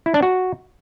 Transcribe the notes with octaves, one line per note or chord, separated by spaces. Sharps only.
E4
D4
F#4